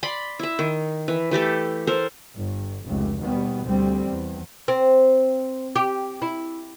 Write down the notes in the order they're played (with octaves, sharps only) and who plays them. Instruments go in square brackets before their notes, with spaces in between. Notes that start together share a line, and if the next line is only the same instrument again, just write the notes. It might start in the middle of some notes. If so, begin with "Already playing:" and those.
[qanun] D5 B5 C6
E4 E5
D#3
E3
E3 A3 G4 A4
A4 A#4 C5
[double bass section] G1
F1 C#2
D#2 B2 G3 B3
D2 G3 C4
E2
[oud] C4
G4
E4